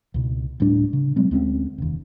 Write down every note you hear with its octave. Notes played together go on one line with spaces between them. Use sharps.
C#2 B2
D1 A2 G3 D4
C#3
B2 F#3 G#3 C4
D2 G#3 C4 C#4
F1 D#2